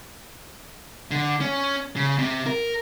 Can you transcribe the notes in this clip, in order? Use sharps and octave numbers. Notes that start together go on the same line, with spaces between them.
D3
C#4
C#3
C3
A#4